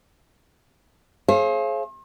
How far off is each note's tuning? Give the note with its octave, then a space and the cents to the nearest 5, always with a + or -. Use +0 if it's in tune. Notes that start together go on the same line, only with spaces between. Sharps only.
G#4 +35 C5 +45 F5 -30